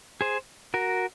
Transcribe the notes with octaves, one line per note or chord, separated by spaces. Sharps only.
G#4 C5
F#4 A#4